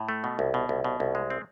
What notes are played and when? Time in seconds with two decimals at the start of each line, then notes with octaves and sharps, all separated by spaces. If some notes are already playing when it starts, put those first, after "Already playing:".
Already playing: A2
0.09 A3
0.24 B2
0.39 C2
0.54 B2
0.69 C2
0.84 B2
1.00 C2
1.15 G#3
1.30 C4